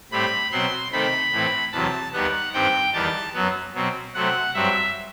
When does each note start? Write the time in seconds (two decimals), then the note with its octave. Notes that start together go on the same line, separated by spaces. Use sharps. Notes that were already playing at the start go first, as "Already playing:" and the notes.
0.11 A2 G3 C4 B5
0.52 B2 F#3 C4 C6
0.92 C3 D#3 A3 C4 B5
1.32 A2 E3 A3 C4
1.72 E2 C3 F#3 A5
2.13 D#2 D#3 G3 B3 F#5
2.53 G2 D#3 G3 C4 G5
2.93 E2 D#3 G3 A5
3.34 F#2 F#3 B3
3.74 B2 F#3 C4
4.14 C3 F#3 A3 C4 F#5
4.54 G2 F#3 C4 E5